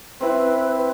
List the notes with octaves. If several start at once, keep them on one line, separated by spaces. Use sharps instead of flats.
C4 E4 B4